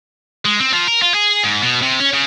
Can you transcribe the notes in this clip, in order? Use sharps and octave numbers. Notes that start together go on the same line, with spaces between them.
G#3
C4
F3
A#4
F4
G#4
G#2
B2
C3
C#4
C#3